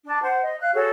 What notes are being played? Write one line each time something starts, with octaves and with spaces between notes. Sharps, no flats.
D4 A5
C5 F#5
D#5
F5 F#6
F#4 G#4 A4 C#5